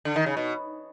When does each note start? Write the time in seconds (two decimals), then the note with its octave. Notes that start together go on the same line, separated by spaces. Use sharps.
0.05 D3
0.16 D#3
0.26 C#3
0.37 B2